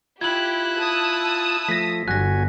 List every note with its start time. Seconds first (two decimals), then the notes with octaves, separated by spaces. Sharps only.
0.21 E4 F4 G4 F#6 G#6 F#7
0.80 A5 D#6 E6
1.69 F3 A3 A#6 B6
2.08 G1 F#4 G#5 F#6 A#6